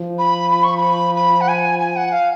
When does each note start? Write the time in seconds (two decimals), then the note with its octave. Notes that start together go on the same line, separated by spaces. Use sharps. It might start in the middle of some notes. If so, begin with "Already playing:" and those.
Already playing: F3
0.19 B5
0.51 B5
0.64 C#6
0.77 B5
1.15 B5
1.41 F#5
1.48 G#5
1.80 G#5
1.96 F#5
2.12 F5